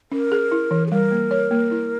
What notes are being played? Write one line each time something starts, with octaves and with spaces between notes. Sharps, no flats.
C#4 A#4
G#4
E4
E3
G#4
G3 A#4
A#3
C#5
A#3
E4